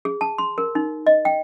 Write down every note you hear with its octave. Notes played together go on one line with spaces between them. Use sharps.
G#4
A5
C6
A#4
D#4
D#5
G5